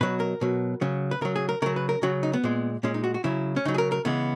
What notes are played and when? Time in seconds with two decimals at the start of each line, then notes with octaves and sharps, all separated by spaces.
0.01 B2 F#3 B4
0.20 A#4
0.41 B2 F#3
0.81 C#3 F#3
1.11 B4
1.21 C#3 F#3 A#4
1.36 G#4
1.49 A#4
1.62 C#3 F#3 A#4
1.76 B4
1.89 A#4
2.03 C#3 F#3 F#4
2.23 D#4
2.33 B3
2.44 A#2 G#3
2.83 A#2 G#3 C#4
2.94 D#4
3.04 F#4
3.14 F#4
3.24 C#3 F#3 E4
3.56 C#4
3.65 C#3 F#3 D#4
3.74 G#4
3.78 A#4
3.92 A#4
4.05 C#3 E3 G#3 B3